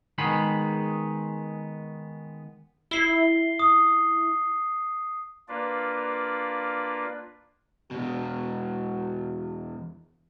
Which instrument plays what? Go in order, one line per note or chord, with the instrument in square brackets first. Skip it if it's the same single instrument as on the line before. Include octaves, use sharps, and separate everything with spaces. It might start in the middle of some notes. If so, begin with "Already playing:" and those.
[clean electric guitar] D#3 G#3 B3 G#4 B5
[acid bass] E4 [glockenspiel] C7 G7
[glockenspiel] D#6
[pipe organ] A#3 D4 F4 B4 D5
[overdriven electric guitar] E2 B2 [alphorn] F#4